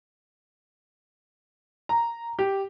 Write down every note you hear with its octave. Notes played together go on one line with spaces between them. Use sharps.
A#5
G4